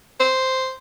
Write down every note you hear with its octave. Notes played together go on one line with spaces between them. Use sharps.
C5